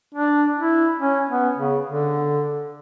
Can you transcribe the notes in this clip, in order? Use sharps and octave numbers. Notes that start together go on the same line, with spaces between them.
D4
E4
C#4
B3
C#3
D3